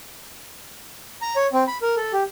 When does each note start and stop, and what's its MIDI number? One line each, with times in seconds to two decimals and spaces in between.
1.21 1.36 82
1.36 1.47 73
1.53 1.64 60
1.68 1.77 83
1.82 1.95 70
1.97 2.12 69
2.13 2.23 67